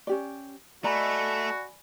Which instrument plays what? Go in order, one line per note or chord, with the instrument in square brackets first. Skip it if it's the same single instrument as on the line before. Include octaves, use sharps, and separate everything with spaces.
[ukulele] C#4 G4 D5
[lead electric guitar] A3 [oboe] F#4 [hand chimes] D5 G#5 B5 [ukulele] D#5 A#5